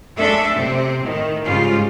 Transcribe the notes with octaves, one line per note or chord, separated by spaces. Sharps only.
G#3 A3 D4 A4 E5
C3 C4
A2 D#3
G#2 C#3 G3 F4